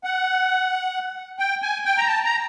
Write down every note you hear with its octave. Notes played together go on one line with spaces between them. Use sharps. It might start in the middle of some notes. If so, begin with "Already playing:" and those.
F#5
G5
G#5
G5
A#5
A5
A#5